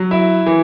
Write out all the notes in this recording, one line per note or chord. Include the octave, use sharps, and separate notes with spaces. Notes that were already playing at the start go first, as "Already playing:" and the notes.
Already playing: F#3
E4
E3